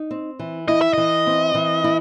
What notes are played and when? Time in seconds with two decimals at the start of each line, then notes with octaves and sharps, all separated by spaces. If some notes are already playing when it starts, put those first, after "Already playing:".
Already playing: D#4
0.11 C4
0.39 E3
0.68 E4 D#5
0.81 E5
0.94 E3 D#5
1.27 C4
1.55 E3
1.84 E4